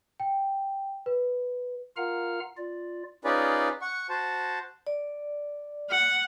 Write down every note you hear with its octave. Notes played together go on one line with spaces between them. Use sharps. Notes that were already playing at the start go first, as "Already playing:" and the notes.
G5
B4
F4 A#4 F5 F#5 A#5 F6
F4 D5
C#4 D#4 F4 G#4 B4 D5
F#5 C#6
F#4 C5 A5
D5
F#5